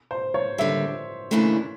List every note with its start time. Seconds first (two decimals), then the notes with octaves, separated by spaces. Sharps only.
0.11 C5
0.34 C#5
0.58 D#2 D3 G3 E5
1.31 D#2 C#3 E3 A3 D4